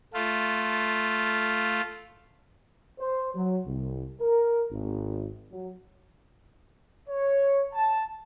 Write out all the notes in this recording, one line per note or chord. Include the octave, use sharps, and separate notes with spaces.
A3 F4
C5
F#3
C2
A#4
G#1
F#3
C#5
A5